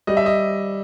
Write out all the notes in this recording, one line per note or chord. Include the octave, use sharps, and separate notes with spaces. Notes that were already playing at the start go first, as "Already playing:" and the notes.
G3 D#5
E5
D#5